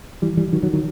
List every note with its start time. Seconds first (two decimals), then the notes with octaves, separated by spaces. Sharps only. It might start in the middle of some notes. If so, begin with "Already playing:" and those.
0.22 E3 G3
0.37 E3 G3
0.53 D#3 F#3
0.63 D#3 F#3
0.73 D#3 F#3